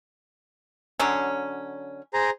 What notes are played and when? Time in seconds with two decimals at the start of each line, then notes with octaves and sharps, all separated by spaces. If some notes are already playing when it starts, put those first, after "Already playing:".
1.00 D3 F#3 C#4
2.14 G#4 C5 A#5